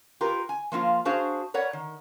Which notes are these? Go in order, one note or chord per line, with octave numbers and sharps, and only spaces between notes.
F4 G4 A#4 B4
G#5
F3 A#3 E4 F4
D4 F#4 G#4 C5 F5
A#4 B4 C#5 D5 F#5
D#3